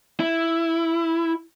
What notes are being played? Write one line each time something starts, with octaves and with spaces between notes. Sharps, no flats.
E4